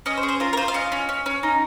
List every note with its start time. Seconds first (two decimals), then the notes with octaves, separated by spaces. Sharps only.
0.06 C#4 D#5
0.17 C5
0.23 G#4
0.29 C5
0.40 F4 A#4
0.53 A#4
0.57 F4 C5
0.68 F5
0.74 C#4 D#5
0.92 C#4
1.09 C#4
1.26 C#4
1.43 D#4